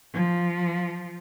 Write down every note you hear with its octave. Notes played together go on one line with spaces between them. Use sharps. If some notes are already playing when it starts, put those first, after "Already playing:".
F3